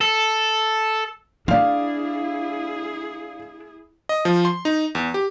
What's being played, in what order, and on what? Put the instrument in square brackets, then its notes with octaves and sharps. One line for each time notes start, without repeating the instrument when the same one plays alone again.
[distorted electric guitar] A4
[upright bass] D4 [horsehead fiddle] E4 G#4 [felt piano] D5 F5
[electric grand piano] D#5
F3
C6
D#4
E2
G4